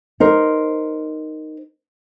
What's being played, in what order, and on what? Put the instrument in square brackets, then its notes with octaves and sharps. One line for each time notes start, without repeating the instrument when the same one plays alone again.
[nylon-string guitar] D#4 A#4 C5